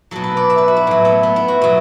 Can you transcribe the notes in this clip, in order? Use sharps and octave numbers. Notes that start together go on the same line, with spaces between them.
B2 F#3 A4
B4
D5
E5
B4
F#4
E4
A2 F#3
B3
B3
E4
F#4
B2 F#3